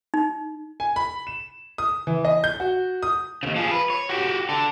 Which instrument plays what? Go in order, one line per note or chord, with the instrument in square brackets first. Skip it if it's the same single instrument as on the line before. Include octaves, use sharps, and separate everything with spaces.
[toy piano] D#4
[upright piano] G#5
B5
E7
D#6
E3
D#5
G6
F#4
D#6
[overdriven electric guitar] D#2 C#3
F3 G#4
B4
C#5
F#4 G4
D3 A4